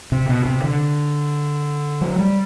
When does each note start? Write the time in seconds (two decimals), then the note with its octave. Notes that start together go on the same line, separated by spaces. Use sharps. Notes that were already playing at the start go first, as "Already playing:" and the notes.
0.12 C3
0.29 B2
0.45 C3
0.64 D3
2.01 F#3
2.19 G3